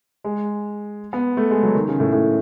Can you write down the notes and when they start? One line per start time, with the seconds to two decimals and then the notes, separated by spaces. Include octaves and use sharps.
0.24 G#3
1.13 B3
1.37 A3
1.51 G#3
1.63 F#3
1.75 D#3
1.88 C#3
2.00 A2
2.12 A2